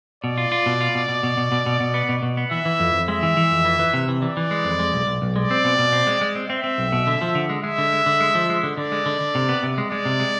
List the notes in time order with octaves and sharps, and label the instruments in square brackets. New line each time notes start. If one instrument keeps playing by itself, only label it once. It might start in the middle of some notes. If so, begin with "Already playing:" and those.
[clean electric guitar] B2 [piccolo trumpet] D5
[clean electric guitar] F4
F4
B2
F4
B2
B2
B2
B2
B2
B2
B2
B3
B2
B2
B3
[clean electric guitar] E3 [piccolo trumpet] E5
[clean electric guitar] E3
F2
F2
[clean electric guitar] G#3 [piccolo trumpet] E5
[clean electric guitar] E3
E3
F2
E3
E3
C3
E3
[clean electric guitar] E3 [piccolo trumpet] D5
[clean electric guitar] E3
G#3
F2
G#3
B1
B1
B1
[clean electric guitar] G#3 [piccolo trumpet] D5
[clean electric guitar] C4
B2
B2
C4
G#3
G#3
C4
[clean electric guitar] C4 [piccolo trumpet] E5
[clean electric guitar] C4
B1
B2
D3
F3
D3
G#3
[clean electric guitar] G#3 [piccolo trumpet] E5
[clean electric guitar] D3
G#3
D3
G#3
F3
G#3
D3
[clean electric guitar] D3 [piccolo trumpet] D5
[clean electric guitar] G#3
D3
D3
C3
B3
C3
G#3
[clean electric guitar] G#3 [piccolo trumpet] D5
[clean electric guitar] C3
G#3